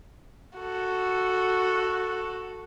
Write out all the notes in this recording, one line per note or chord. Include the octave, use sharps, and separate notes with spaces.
F#4 A4